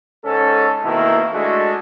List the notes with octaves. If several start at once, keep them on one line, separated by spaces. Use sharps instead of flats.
G#2 C#4 A4
B2 D#3 A3 A#3 E4
G#3 A3 D4 F#4 A4